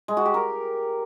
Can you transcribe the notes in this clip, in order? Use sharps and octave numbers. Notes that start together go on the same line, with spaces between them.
G#3
F#4
G4
A#4